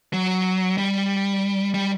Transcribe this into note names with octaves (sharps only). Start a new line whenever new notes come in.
F#3
G3
G3